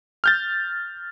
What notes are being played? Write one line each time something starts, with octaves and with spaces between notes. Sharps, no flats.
F6 G6 A6